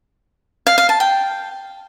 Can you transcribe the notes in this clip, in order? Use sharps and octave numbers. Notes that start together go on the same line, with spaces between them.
F5
F5
A5
G5